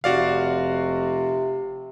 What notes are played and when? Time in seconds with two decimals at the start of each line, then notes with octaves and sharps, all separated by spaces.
0.04 F1 C3 F#4 D5 F5